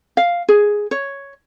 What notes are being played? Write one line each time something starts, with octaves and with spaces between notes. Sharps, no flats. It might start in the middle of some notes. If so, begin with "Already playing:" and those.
F5
G#4
C#5